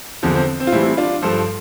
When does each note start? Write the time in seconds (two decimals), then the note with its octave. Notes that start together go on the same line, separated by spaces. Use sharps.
0.23 E2 D3 F3 C4
0.35 C4
0.60 C4
0.67 F4
0.72 A2 E3 G3 C4 E4
0.97 D4 F4
1.22 G2 F3 A4 C5